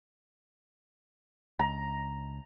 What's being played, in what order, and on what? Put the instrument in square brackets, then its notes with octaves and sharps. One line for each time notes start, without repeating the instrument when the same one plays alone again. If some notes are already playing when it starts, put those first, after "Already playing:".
[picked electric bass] C#2 [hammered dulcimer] A#5